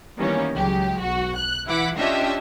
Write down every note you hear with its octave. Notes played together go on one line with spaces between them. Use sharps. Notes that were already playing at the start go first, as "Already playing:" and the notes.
D#3 E3 G3 A#3 B3 C#4
C#2 F#3 G#3 G4
B1 F#4
F#6
E3 E4 F#5 D6 B6
C#4 D4 F4 G4 D#5 E5